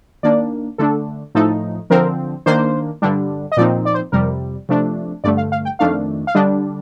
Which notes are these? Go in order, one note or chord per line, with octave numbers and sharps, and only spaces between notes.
D#3 A#3 D4 D5
D3 A3 D4 A4
A2 F3 A3 D#4 A4
D3 F3 C4 A#4
D#3 A#3 D4 C5
G2 D3 G3 D4
D#5
A#2 F3 C4 D#4 D5
D5
C5
F2 C3 G3 A#4
C3 F3 A3 D4
G2 D3 A3 D5
F5
F5
G5
F2 D#3 A3 D4 F5
F5
D3 G3 D4 D#5